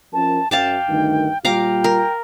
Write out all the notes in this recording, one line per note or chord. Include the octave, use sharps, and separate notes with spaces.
F3 C#4 A#4 A5
F#2 F5 G5 A5 D6
D2 G2 D#3
A#2 G3 F4 F5 G5 A#5 D6
A#4